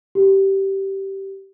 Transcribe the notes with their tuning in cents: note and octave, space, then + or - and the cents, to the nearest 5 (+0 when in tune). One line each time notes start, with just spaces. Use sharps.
G4 -15